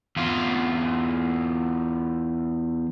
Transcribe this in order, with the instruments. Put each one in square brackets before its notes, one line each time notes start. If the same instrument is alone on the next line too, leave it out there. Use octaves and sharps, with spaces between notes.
[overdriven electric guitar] E2 F4